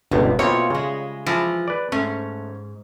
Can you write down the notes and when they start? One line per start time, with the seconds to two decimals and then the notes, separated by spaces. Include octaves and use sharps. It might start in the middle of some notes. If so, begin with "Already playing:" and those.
0.12 G1 C#2 B2 D3
0.39 B2 A#3 C4 E4 F4 C#5
0.70 C#3 G3 G#3
1.26 E3 F3
1.68 B4 D5
1.92 G#2 A3 C#4